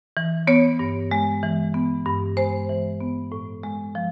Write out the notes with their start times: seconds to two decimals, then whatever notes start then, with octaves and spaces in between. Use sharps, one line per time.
0.17 E3
0.47 B3 C#5
0.79 G2
1.11 G#3
1.43 E3
1.74 B3
2.06 G2
2.37 G#3 C5
2.69 E3
3.00 B3
3.32 A2
3.64 G#3
3.95 F3